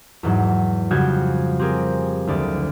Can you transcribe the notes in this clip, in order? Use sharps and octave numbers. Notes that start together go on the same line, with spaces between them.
E2 G#2 F#3
F2 C#3 G3 F#4 G6 G#6
C4 G4 G#4 A#4
F#1 D2 D5